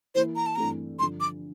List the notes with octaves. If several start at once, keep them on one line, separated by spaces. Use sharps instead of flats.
E3 A#3 E4 C5
A#5
A5
G2 E3 A3 C4 A#5
G2 D3 F3 C6
D6